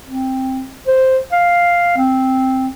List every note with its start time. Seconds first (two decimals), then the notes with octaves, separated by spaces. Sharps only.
0.06 C4
0.87 C5
1.32 F5
1.97 C4